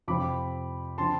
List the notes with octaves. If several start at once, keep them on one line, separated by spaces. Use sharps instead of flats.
F2 C3 F3 C4 B5 D6
D3 F3 C4 A5 C6